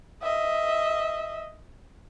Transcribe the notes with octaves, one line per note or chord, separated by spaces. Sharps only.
D#5 E5